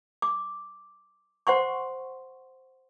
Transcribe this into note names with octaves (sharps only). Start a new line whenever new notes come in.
D6
C5 F#5 C6 C#6